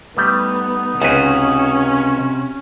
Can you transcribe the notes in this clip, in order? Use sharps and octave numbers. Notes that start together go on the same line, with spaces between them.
G3 A3 B3 D#4
C#2 C3 C#4 F#4 B4